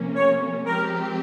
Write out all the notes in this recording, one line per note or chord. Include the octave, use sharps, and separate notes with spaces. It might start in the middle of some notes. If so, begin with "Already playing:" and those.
Already playing: C3 F3 A#3 C#4
C#5
F3 G#3 C4 G4 A#4